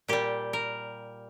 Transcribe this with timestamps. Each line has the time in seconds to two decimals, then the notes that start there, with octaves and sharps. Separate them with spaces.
0.08 A#2 G3 G4
0.53 A#4